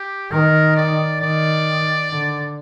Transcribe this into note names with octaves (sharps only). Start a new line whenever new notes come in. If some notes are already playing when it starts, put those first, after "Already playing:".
Already playing: G4
D#3 A#4
D5
D#3 D5
D3